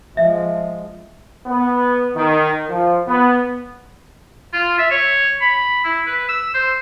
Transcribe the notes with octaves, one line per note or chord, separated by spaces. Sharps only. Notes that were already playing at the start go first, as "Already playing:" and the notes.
F3 G#3 E5
B3
D#3
F3
B3
F4
E5
C#5
B5
E4
B4
E6
C5